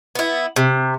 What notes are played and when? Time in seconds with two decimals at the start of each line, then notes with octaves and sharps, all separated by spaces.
0.15 B3 E4
0.56 C3